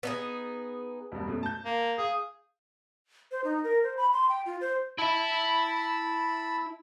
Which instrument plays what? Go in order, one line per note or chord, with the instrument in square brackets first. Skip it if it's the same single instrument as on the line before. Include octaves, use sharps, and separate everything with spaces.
[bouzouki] B3 D#4 G#4
[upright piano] E1 G2
F#2 B2 A3
A5 G6
[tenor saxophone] A#3
[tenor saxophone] G#4 [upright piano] F5
[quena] C5
D#4
A#4
C5
B5
C6
G5
F4
C5
[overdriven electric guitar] E4 E5 [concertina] A5 B5 E6